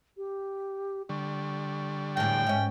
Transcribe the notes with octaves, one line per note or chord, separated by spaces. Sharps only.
G4
D3 G3 C#6
E2 A2 G5
G#2 C#4 E5